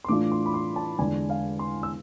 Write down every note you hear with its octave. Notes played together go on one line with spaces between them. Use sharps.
C6
A2 E3 A3 D4 F4 D6
C6
B5
C6
A5
E2 D3 G#3 G#5
F5
C6
E6